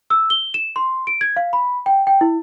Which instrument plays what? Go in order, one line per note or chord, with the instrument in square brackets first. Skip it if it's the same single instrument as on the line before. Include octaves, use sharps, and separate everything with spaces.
[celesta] E6
G7
E7
C6
D7
G#6
F5
B5
G5
G5
E4